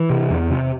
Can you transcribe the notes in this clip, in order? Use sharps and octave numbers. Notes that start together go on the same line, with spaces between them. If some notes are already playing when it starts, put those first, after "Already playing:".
Already playing: E3
C3
E2
C3